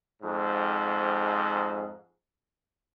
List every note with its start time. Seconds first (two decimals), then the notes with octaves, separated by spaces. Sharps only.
0.22 F2 G#2